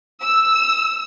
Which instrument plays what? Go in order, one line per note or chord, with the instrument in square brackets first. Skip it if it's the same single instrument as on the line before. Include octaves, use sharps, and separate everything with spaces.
[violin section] E6